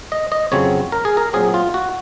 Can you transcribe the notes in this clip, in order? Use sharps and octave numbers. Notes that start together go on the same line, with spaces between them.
D#5
D#5
F2 C#3 F#3 C4 C#5
A#4
G#4
A#4
A#2 F#3 C4 G#4
F4
F#4